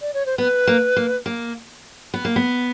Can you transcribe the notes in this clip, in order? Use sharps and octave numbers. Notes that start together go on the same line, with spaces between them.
D5
C#5
C5
B3 B4
A#3
A#3
A#3
B3
A#3
B3